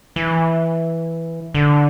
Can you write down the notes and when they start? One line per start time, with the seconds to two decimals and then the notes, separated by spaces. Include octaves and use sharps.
0.16 E3
1.54 D3